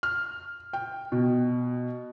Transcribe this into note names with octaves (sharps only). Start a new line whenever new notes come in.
F6
G5
B2